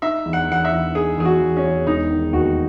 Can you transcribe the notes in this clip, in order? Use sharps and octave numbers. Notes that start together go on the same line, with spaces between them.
D#4 E5
E2
F#5
E2 F#5
E5
E2
D#4 G#4
E2 G#4
F#4
E2
C#4
E2
E1 D#4
D#3
D#2 F#4